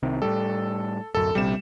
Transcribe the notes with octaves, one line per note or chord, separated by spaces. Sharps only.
C2 C3 D#3
A2 G3 A4
D1 F#2 A4
A#1 C3 G3 E7